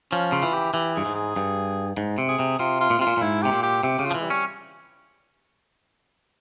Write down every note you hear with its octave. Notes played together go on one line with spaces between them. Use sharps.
F3 C#4
C#3 F4
E3
G4
E3 G4
G2 G#4
G#2
G#4
G2
G#2
C3
G#4
C3
C3 F4
F4
A#2
C3 F4
A#2
A#2
G#2 E4
C3 G4
A#2
G4
C3 G4
C#3
F4
F3
E3
G#3
G3
C#4